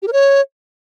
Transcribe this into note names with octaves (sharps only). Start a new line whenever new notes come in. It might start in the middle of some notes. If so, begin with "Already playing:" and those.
G4
A#4
C#5